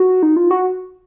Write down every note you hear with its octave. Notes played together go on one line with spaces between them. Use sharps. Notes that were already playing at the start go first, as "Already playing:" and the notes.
Already playing: F#4
D#4
F4
F#4